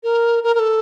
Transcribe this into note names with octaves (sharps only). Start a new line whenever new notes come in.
A#4
A#4
A#4
A4